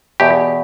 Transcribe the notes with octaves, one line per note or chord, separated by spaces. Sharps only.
E2 B2 G4